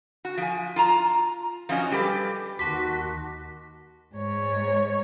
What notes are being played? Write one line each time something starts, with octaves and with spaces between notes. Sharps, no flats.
F#4
F3 G#5
F4 A5 A#5
F3 F#3 C#4 D#5
G3 G4 A4 B4
D#2 D#3 F#4 A5 C6 D6 B6
G#2 C#5